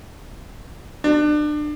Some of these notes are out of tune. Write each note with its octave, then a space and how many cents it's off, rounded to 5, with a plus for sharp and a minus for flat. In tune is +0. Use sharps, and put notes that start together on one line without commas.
D4 +30